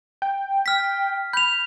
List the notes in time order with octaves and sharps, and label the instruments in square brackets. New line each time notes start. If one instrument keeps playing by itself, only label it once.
[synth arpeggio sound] G5
[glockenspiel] F6 B6
[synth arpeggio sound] B5 [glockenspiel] G6 F7